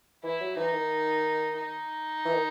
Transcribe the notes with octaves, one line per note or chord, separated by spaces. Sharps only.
E3 E4
F#3
E3 D#4
D#3
D#4
E3
D#3